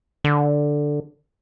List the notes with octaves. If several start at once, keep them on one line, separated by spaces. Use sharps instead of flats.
D3